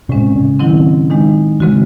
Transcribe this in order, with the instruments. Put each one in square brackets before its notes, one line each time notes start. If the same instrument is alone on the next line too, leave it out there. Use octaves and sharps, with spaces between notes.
[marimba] A2 G#3 C#4 [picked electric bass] C3
[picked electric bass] C#3
[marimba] D#3 F#3 C4 E4
D#3 G#3 D#4
[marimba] C#3 G#3 C4 F#4 [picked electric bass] E3